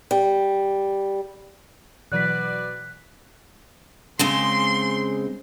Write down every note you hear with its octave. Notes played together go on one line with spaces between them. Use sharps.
G3
B2 E3 F#3 F#4 B4 D5 F#6 B6
C#3 G#3 C4 C6